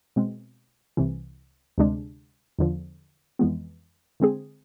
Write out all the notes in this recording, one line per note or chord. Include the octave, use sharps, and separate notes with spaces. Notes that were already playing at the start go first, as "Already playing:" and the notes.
B2 G#3 C4
C2 C3 E3
D2 C3 G#3 D4
E2 D3 F3
F2 E3 G#3 B3
D3 G#3 C4 G#4